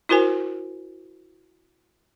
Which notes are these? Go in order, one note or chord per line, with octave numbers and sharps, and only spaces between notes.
E4 F#4 A#4 C5 G#5